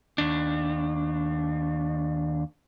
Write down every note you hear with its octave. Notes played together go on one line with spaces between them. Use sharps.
D#2 D4